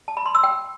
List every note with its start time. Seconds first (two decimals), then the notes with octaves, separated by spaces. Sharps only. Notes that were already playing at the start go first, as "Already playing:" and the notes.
0.08 A5
0.17 B5
0.26 C6
0.35 E6
0.43 G5